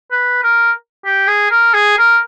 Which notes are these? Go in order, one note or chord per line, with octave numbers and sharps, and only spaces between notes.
B4
A#4
G4
G#4
A#4
G#4
A#4